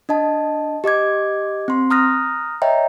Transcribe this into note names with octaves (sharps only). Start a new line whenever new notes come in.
D4 D#5 A5
G4 D#5 D6 G#6
C4 C6
A#5 D#6 F6 F#6 A#6
C#5 D#5 E5 G5 A#5